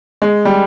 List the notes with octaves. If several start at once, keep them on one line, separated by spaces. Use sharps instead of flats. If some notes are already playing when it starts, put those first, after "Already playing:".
G#3
G3